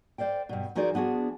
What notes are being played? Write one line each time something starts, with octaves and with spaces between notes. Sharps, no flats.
C5 D5 F5 G5
G2 B2
F3 D#4 F#4 G#4 A#4 D5
F3 B3 D4 F#4 G#4